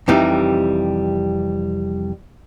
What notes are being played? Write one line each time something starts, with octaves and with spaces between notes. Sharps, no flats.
F2 C3 E3 G3 D#4